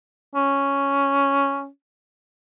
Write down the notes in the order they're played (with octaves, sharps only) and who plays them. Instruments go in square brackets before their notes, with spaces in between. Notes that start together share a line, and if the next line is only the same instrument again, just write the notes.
[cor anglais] C#4